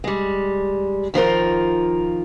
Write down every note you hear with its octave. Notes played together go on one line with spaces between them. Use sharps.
G3 G#3
D#3 F3 F4 A#4